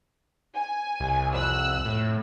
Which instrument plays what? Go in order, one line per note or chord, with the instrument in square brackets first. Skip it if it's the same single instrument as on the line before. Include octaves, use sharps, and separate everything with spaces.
[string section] G#5
[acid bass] C2
[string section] F2 E6 F#6
[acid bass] A2